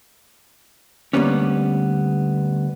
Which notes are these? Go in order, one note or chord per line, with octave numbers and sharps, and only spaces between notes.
D2 C#3 G3 A#3 B3 C#4